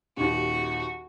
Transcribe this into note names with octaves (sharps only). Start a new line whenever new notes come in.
D#1 D#2 F#4